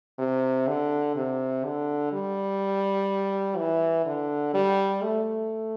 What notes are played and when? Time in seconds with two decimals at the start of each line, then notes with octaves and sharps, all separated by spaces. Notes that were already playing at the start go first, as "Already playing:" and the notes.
0.19 C3
0.68 D3
1.16 C3
1.65 D3
2.13 G3
3.57 E3
4.06 D3
4.54 G3
5.03 A3